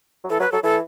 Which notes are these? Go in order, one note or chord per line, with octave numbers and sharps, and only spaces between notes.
F#3
E3 A4
F#3 B4
F#3 A4
E3 A4